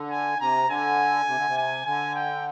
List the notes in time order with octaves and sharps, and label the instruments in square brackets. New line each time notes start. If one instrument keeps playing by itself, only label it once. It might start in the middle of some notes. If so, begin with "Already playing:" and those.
Already playing: [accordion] D3
[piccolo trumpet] G#5
[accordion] C3 [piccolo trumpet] A#5
[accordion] D3 [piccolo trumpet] G#5
[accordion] C3
D3
C3
[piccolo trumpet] G#5
[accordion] D3 [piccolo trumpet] G#5
[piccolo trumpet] G5